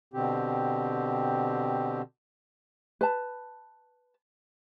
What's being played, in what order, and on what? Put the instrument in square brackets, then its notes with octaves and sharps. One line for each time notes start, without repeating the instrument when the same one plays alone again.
[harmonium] B2 D3 C4 G4
[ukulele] B4 A5